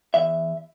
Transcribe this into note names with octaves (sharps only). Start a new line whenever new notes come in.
E2 E5